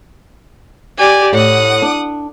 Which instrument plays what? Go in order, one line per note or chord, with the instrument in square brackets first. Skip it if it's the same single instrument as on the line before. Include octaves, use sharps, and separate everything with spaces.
[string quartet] G4 D5 G#5
[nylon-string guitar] A2 [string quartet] F#5 D#6
[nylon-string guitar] D4